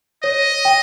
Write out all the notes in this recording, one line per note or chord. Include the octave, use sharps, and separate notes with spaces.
C#5 D#5
G5